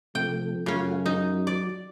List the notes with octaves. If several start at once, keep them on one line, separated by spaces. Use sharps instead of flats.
C3 F3 A3 G5
F#2 C#3 A3 C#4 F4 F#4
F#3 D#4
D5